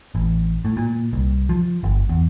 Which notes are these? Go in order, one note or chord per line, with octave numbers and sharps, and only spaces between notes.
A1
A2
A#2
C2
F3
G1
E2